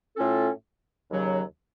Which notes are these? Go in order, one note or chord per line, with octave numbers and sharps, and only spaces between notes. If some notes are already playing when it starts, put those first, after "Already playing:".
A2 A3 C#4 F4 A4
D#2 C#3 F#3